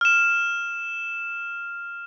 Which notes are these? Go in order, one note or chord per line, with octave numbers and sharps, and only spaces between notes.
F6 E7